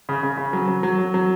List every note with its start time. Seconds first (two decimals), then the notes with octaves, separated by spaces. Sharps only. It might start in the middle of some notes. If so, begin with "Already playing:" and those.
0.09 C#3
0.23 C#3
0.38 C#3
0.53 F#3
0.68 F#3
0.83 F#3
0.98 F#3
1.14 F#3